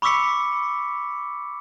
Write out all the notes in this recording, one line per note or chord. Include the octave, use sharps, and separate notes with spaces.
B5 C#6 D6 E6 B6 C#7